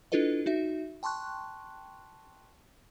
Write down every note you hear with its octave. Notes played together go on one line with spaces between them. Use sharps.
D4 E4 F4 A4 B4 D#5
D#4 F#4 E5
G5 A5 C6 C#6 F#6